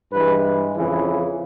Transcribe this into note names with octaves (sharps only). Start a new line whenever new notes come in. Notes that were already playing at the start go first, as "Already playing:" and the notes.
G2 E3 G#3 B4
F2 C#3 E3